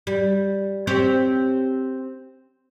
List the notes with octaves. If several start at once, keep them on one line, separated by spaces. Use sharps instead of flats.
G3
C4 G4 C#5